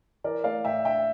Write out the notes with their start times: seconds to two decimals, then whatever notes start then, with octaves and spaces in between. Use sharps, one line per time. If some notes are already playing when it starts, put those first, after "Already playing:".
0.24 E3 A#4 D5
0.44 A3 D5 F5
0.65 A2 E5 G5
0.85 D4 E5 G5